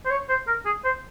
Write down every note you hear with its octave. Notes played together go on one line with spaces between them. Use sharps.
C5
C#5
C5
A#4
G#4
C5